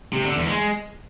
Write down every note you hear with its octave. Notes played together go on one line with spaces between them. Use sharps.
C3
D3
E2
G#3